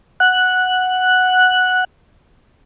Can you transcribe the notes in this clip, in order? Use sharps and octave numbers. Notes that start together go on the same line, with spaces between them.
F#5 F#6